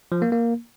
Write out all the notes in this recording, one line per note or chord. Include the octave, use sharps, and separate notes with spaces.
F3
A#3
A#3